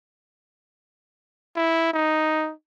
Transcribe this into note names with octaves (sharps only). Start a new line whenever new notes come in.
E4
D#4